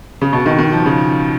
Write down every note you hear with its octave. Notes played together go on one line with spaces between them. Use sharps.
C#3
B2
D#3
D#3
F3
C#3